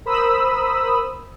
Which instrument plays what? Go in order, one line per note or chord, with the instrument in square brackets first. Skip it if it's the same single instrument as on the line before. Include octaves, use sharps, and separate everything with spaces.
[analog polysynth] A#4 C5 B5 D#6 E6